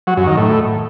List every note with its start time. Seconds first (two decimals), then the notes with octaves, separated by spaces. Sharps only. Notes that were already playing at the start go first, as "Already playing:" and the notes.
0.07 F#3
0.17 F#2
0.27 D#3
0.37 A2